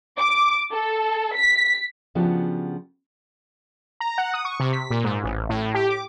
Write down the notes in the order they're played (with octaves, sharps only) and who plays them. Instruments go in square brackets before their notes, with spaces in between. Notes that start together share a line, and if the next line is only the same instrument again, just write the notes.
[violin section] D6
A4
B6
[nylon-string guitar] C#3 F3 B3 D4 F#4 G4
[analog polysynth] A#5
F#5
D#6
C#6
C3
B6
A#2
G#2
A1
A2
G4
D6